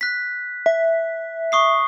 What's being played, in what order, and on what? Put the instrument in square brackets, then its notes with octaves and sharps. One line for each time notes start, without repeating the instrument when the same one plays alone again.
[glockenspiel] F#6 B6
[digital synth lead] E5
[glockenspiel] C#6 D#6 C7